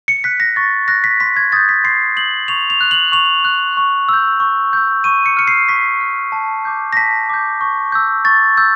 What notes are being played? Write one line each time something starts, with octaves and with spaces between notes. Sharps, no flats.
C#7
F#6 B6
A#6
C#6 A6
F#6 A#6
B6
C6 B6
G#6
D#6 G6 A6
B6
C6 C7
D#6 G6 F#7
C#6 F7
F7
F#6
F#7
C#6 F7
F#6
C#6
E6 G6
C#6
E6 G6
C#6 D#7
C#7
F6 C#7
C7
C#6 B6
F6
A5
D6 G6
A#6
A5 B6
D6 G6
C#6
E6 G6
C#6 A6
E6 G6